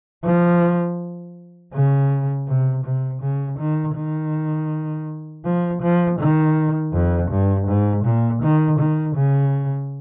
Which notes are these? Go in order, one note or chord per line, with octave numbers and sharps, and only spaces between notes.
F3
C#3
C3
C3
C#3
D#3
D#3
F3
F3
D#3
F2
G2
G#2
A#2
D#3
D#3
C#3